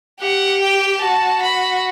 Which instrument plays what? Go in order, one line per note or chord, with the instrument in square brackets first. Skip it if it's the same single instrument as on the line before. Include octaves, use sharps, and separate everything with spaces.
[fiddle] G4 [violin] F#5
[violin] G5
[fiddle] F#4 [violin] A5
[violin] B5